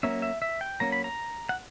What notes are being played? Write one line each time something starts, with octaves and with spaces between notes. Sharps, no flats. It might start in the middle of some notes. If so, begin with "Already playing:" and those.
F#3 A#3 C#4 E5
E5
E5
G5
F#3 A#3 C#4 A#5
B5
A#5
F#5